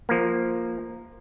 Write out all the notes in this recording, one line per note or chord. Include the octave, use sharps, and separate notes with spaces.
F3 A#3